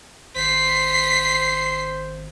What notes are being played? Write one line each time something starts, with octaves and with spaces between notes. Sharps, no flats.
G#1 C5 B6 C7